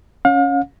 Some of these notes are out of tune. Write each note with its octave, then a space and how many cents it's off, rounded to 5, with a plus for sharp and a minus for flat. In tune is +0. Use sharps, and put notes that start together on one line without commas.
C#4 +0 F5 +40